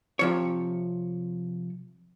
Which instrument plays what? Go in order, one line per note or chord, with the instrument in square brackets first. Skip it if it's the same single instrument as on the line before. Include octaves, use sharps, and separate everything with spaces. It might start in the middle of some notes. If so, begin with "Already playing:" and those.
[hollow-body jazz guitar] C3 F3 C#5